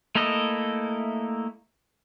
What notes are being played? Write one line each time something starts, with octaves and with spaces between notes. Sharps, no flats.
A3 A#3 E4 A4 D#5